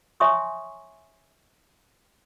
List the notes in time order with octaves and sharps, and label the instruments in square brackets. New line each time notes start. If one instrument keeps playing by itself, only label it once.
[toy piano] C#5 E5 G#5 C6 C#6 D#6